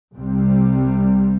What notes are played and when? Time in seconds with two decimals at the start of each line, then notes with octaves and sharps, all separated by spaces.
0.13 C2 C3 G3 C4